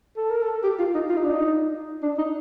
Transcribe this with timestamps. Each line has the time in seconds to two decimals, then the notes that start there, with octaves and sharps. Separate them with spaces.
0.17 A4
0.30 A#4
0.43 A4
0.63 G4
0.79 F4
0.94 D#4
1.09 F4
1.17 D#4
1.24 D4
1.32 D#4
2.02 D4
2.18 D#4